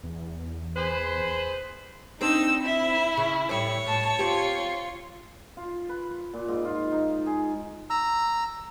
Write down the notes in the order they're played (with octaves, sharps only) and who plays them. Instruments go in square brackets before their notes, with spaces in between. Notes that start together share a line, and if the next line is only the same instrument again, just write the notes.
[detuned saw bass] E2
[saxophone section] G#4 B4 C5
[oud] C4 D4 C5 [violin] D#4 [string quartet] E6
[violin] E4 [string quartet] E5
[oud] C#3
[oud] A2 G3 [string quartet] C#5
[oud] A2 [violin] A5
[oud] C4 G4 [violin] F4
[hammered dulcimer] F4
B4
A#2
G#2
F4
D#4
G#4
[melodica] A#5 E6